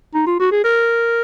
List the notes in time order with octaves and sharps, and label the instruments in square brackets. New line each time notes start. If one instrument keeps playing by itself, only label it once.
[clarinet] D#4
F4
F#4
G#4
A#4